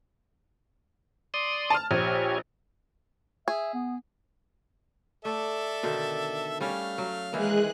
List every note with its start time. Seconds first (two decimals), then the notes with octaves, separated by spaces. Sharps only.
1.34 D5 C6 D#6
1.70 A5 F6
1.91 A#1 G4 C#5 G#5
3.48 G#4 E5
3.74 B3
5.25 A3 A4 D5 E5
5.83 B2 D3 D#3
6.61 G3 A3 C#4 F5
6.98 F#3
7.32 D#3 E3 G#3 A#3 G#4 F#6